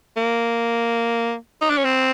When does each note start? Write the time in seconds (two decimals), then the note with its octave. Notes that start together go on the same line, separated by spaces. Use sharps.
0.17 A#3
1.62 D#4
1.70 D4
1.77 C#4
1.85 C4